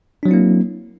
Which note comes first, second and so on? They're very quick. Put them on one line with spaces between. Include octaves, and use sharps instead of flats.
D4 F#3 C4 E4 A#3